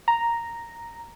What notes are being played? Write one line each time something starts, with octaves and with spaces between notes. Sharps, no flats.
A#5